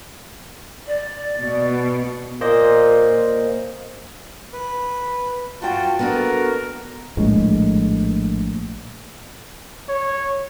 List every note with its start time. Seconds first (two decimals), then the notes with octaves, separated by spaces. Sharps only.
0.87 D5
1.41 B2
2.41 A#2 A#3 C5 D#5
4.53 B4
5.62 G2 F4 F#4 G5 A5
5.99 B3 D4 F#4 A4 A#4
7.17 A#1 A2 G#3
9.89 C#5